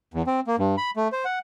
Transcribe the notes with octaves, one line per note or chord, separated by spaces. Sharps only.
E2
C4
A#3
G2
B5
A3
C5
F#5